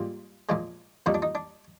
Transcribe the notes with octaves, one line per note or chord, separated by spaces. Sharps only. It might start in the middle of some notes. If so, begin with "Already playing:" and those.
Already playing: G#2 G3 A#3 F4
A#2 F3 G#3
F2 C3 G3 A#3 D#4
D4
D#4
D4